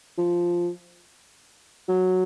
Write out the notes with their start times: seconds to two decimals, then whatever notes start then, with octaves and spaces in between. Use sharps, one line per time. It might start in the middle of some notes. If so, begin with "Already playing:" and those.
0.18 F3
1.89 F#3